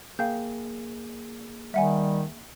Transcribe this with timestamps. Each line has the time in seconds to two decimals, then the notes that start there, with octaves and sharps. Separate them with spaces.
0.19 A#3 G#4 F5 G5 G6
1.74 D#3 G3 E5 F#5 G#5